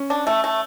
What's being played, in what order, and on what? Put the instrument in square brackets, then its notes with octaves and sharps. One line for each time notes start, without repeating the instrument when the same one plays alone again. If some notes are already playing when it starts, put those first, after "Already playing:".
Already playing: [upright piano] C#4
[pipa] D4
A3
A3